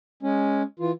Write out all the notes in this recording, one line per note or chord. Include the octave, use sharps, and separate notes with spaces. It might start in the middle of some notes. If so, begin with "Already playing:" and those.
G#3 C#4
E3 F4